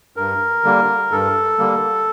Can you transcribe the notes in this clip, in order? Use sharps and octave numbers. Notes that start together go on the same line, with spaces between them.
G2 A#4
D3 G3 A#3
G2 A4
D3 G3 A#3